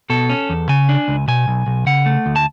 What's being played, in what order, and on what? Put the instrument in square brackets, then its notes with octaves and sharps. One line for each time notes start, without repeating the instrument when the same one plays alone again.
[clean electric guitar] B2 A4
C#4
E2
C#3 G#5
D4
C#2
B2 G#5
B1
B1
C#3 F#5
A3
D2
A5